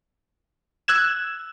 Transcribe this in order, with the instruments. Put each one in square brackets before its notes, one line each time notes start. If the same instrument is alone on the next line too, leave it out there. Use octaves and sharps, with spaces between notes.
[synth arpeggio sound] E6 F#6 G#6 E7